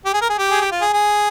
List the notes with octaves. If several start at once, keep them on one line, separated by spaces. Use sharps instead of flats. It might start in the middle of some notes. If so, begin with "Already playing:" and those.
G4
G#4
A#4
G#4
G4
G#4
G4
F4
G#4
G#4